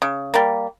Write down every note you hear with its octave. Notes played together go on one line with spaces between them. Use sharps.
C#3
G3 A#3